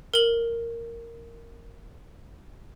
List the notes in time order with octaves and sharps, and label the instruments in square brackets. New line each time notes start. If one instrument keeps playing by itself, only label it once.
[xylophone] A#4 F#7